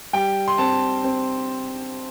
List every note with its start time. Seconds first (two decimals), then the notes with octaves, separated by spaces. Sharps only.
0.13 G3 G5
0.48 C6
0.58 C4 A5
1.04 C4